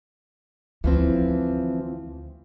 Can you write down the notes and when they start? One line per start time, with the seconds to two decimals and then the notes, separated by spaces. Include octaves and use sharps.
0.84 D2 E3 F3 C4